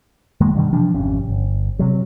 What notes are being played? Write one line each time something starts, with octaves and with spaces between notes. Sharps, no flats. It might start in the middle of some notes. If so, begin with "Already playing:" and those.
F#2 D#3 G#3 A#3
G2 B2 D#3 G3
C3 E3 F3 D4
G#1 F2 C3 C#4
G1
C3 F#3